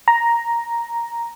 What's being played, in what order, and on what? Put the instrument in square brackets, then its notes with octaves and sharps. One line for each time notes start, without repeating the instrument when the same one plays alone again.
[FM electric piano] A#5